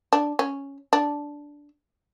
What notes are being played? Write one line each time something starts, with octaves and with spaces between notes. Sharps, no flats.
D4
C#4
D4